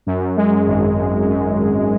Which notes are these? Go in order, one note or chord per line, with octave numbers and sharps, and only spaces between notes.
F#2
G#3
G#1
G#1
F#2
G#1